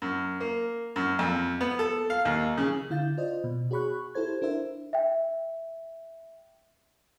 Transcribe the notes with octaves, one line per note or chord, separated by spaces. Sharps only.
F#2
A#3
F#2
F2
B3
A4
F5
D#2
C#3
D3 E4 F5 G6 A6
F4 C5 D5 D#5
B2
F#4 G#4 C#5 B5 C#6 F#6
E4 G4 A4 C5 G#6
D4 E4 A#4 C5 E5
E5 G5